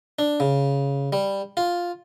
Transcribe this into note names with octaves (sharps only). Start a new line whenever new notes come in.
D4
C#3
G3
F4